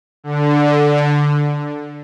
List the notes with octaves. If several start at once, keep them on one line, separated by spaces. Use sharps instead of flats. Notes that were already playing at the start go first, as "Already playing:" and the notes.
D3